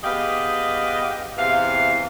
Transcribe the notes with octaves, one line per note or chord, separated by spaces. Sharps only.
B3 G4 G#4 D#5 F5
E2 C3 E3 F5